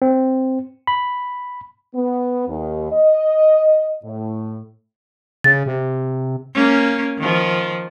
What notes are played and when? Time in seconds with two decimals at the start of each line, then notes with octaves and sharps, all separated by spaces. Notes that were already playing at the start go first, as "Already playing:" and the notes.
0.02 C4
0.87 B5
1.94 B3
2.47 D#2
2.91 D#5
4.03 A2
5.44 C#3 A6
5.66 C3
6.54 A#3 C#4
7.18 D#3 F3